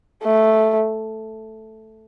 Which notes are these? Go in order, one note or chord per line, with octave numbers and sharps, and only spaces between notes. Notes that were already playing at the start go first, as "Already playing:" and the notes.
A3